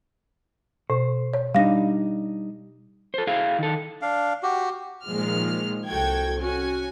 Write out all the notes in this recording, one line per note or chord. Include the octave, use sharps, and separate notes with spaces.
B2 C5
C#5
G3 D4 D#4 F5 A#6
A4 C5
E4 G#4 F5
D#3 A4
D4 F5
F#4 G4
A#2 D#3 F3 G#3 F6
C2 F#4 A4 G5 G#6
C#4 F#4 G#5